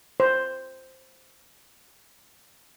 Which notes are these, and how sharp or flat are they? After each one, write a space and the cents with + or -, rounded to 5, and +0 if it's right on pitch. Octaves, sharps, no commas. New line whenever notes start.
C5 +0